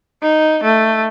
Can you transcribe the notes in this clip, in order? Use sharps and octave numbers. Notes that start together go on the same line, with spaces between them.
D#4
A3